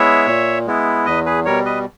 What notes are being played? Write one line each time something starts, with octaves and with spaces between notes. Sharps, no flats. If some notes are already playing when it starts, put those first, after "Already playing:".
Already playing: G#3 B3 E4 C#5 E5
A#2
G#3 B3 E4
E2 B4 D#5
G#4 B4
B2 G3 A#4 C#5
B4 D#5